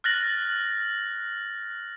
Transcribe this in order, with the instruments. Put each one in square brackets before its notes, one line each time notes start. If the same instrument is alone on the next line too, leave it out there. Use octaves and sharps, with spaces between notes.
[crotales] F6 F#6 A6 A#6 F#7